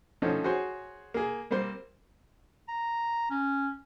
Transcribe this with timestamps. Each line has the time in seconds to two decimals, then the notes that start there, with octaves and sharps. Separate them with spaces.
0.22 D3 F3 A3 C4 C#4 D#4
0.44 F#4 G#4 C5 C#5
1.14 A#3 G#4
1.51 G3 A#3 C4 C5
2.68 A#5
3.30 C#4